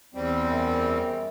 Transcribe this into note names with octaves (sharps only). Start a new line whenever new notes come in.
E2 G3 C4
F#2